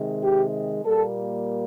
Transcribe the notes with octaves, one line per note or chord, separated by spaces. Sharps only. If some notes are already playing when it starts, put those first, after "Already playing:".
Already playing: C3 D#3 G#3
G4
A#2 G3 A#3 A4